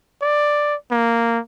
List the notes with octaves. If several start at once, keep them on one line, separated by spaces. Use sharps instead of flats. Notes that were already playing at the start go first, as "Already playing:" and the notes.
D5
A#3